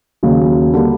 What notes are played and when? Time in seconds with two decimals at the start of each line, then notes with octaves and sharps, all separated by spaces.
0.23 D#2 C#3 F#3
0.74 D3 G3 A#3